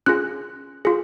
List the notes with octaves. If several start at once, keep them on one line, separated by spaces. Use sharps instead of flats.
C#4 F4 G#4 F#6
F4 G#4